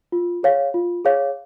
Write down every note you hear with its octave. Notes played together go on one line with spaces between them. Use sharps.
F4
G#4 C#5 F5
F4
G#4 C#5 F5